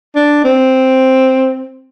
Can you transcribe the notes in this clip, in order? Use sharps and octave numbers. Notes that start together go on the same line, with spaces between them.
D4
C4